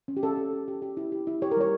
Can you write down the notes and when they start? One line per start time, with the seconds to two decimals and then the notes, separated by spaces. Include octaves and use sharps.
0.08 C#4
0.17 G4
0.23 C#4 A4
0.38 C#4
0.53 G4
0.68 G4
0.82 G4
0.97 E4
1.12 G4
1.27 E4
1.42 G4 C#5
1.51 A#4
1.57 G3 C#5